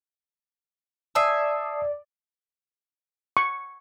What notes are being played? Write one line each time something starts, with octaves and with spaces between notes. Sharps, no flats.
D5 E5 G#5 A5 D#6 C7
C#6